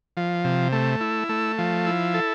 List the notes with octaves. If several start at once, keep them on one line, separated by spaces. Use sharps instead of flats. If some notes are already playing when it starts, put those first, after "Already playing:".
F3
C3
A3
E4
A3
F3
E4
A4